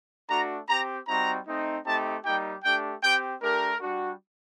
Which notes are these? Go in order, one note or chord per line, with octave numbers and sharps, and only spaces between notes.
A3 D4 F#4 A#5
C4 G4 A#5
G3 C4 D#4 F#4 A#5
A3 C4 D#4
A3 C4 D#4 G4 A5
G3 A#3 D#4 G4 G5
A3 D4 G4 G5
C4 G4 G5
A3 D4 G4 A#4
G3 D4 F#4